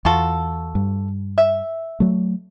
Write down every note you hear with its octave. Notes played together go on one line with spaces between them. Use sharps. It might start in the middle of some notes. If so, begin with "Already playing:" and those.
E2 F4 F#4 A4
G2
E5
F#3 A3